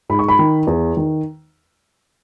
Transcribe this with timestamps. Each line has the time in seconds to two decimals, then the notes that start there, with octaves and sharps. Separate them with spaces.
0.09 G#2 B5
0.19 C#6
0.29 B5
0.39 D#3
0.67 E2
0.97 D#3